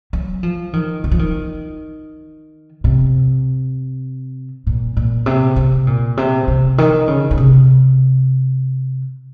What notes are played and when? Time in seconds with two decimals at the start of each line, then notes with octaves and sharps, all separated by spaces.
0.13 F#3
0.43 F3
0.73 D#3
1.04 D#3
1.11 F3
1.19 D#3
2.84 C3
4.67 A#2
4.97 A#2
5.26 C3
5.56 C3
5.87 A#2
6.17 C3
6.48 C3
6.78 D#3
7.08 C#3
7.31 C#3
7.38 C3